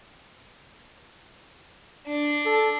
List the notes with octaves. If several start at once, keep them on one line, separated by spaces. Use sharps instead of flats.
D4
A4